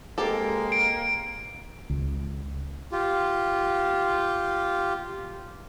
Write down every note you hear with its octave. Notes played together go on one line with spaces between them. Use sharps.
G#3 A#3 C4 G4 A4
D7
C#2
F4 G4